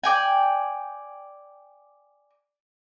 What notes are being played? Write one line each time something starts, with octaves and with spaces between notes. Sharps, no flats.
D5 G5 G#5